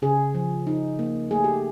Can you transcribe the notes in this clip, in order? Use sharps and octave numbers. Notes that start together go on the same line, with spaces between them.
C#3 G#4
F3
D#4
A#3
A3 G#4
G4